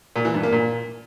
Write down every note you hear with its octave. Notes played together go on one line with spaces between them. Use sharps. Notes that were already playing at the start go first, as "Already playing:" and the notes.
A#2
E3
G2
A#3
A#2